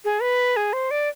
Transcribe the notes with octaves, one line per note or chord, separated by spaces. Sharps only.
G#4
B4
G#4
C5
D5